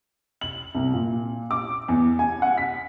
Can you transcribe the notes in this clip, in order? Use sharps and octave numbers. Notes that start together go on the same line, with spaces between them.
F#7
C2
A#2
D6
E2
G#5
F#5
B6